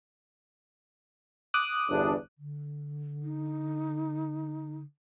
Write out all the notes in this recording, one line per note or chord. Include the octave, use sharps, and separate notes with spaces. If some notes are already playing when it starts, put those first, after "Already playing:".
D6 D#6 F#6
G1 E2 D4
D3
D#4